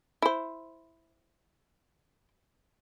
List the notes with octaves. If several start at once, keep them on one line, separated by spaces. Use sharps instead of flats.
E4 C5